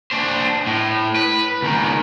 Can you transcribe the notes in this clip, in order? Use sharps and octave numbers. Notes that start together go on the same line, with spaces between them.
D4 C5
A2
B4
C#2 D#3